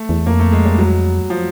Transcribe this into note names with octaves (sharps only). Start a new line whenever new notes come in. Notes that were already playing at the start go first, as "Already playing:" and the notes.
Already playing: A3
E2
F2 A#3
A3
G#3
G3
F#3
F3